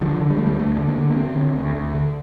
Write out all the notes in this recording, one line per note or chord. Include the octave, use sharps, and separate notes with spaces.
D3 F3
D3
G3
D2 A3
G3
D2 A3
D3
A#3
D3
A#3
D3 C4
D3
D2
D2
D3